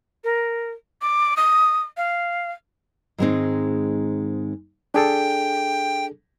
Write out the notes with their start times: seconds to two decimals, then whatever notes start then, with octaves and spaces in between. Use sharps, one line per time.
0.24 A#4
1.02 D6
1.37 D#6
1.97 F5
3.18 G#2 D#3 G#3 A3 C4 D#4
4.94 D4 G#4 A4 G5